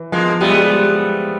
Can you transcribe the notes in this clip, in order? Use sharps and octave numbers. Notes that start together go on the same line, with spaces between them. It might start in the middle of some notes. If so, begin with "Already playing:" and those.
Already playing: E3
F3 G#3 A#3
G3 A3 B3
G#3
G3